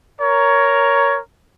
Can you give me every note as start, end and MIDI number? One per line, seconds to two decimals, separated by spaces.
0.21 1.19 70
0.21 1.19 73